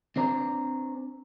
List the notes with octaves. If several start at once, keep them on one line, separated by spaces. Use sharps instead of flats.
C4 D4 C5 A#5